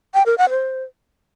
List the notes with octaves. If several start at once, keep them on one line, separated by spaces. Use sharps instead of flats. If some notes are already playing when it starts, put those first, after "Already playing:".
G5
A#4
F#5
C5